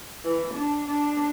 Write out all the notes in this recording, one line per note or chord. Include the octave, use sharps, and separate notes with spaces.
E3
D4
D4